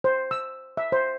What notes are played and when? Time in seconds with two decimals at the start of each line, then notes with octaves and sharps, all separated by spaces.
0.04 C5
0.31 E6
0.77 E5
0.92 C5